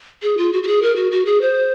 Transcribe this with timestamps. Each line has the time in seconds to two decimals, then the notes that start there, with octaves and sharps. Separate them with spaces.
0.22 G#4
0.37 F4
0.53 F#4
0.63 F#4
0.67 G#4
0.82 A#4
0.96 F#4
1.12 F#4
1.26 G#4
1.41 C5